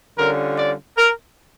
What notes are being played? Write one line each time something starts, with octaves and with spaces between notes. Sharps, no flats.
D3 G3 C#4 F4 A#4
D5
A#4